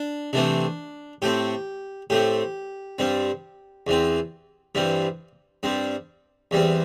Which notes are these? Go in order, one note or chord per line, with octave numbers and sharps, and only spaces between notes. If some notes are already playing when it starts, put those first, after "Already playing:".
Already playing: D4
C3 E3 A3 C4 D4
A2 A3 C4 G4
A2 A3 C4 G4
G2 G3 C4
E2 E3 C4
G2 E3 G3 C4
G2 G3 C4
E2 E3 G3 C4